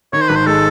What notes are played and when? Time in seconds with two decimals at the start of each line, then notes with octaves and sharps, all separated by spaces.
0.13 D#3 C#5
0.21 C5
0.28 G#1 B4
0.35 C5
0.47 G#3 A4